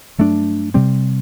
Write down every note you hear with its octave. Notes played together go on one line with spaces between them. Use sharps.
G2 F#3 A3 D4
C3 G3 C4